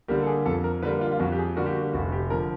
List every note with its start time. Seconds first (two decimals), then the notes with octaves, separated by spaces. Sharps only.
0.08 D3 G3 A#3 G4
0.22 A4
0.27 G#4
0.46 F2 A4
0.64 A#4
0.82 D3 G3 A#3 B4
1.01 F4
1.12 F4
1.19 F2 F#4
1.32 G4
1.38 G#4
1.56 D3 G3 A#3 F#4
1.66 G4
1.75 F#4
1.93 F1 F#4
2.12 G4
2.30 D3 F3 A#4